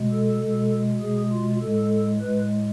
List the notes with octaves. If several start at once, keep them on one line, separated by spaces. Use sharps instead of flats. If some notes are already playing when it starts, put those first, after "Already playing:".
Already playing: B2 G#3
A4
B2 G#3
B2 G#3 G#4
F4
A2 G#3 A4
A2 G#3 B4